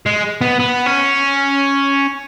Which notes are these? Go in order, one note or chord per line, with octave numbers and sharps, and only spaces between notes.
G#3
B3
B3
C#4